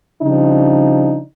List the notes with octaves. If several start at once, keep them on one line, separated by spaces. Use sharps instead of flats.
C#3 F3 G3 D4 D#4